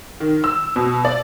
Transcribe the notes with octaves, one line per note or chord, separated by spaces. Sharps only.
D#3
E6
B2
D5